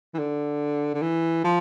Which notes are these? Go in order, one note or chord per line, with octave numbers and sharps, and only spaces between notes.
E3
D3
D3
E3
F3